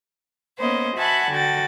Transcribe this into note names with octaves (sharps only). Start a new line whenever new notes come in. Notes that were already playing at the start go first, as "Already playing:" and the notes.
A#3 B3 C#4 C5 D#5
F#4 E5 F#5 G#5 A5 B5
D3 F#4 G5 A6